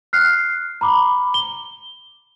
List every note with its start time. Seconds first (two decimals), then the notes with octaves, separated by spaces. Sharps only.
0.13 F6 F#6 C7
0.81 A#5 B5 D6
1.34 G7